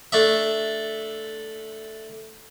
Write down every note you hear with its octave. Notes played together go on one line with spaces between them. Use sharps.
A3 D4 E5